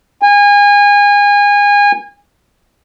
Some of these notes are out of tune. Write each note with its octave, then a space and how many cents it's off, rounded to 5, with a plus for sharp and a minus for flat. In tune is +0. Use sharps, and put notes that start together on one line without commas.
G#5 -30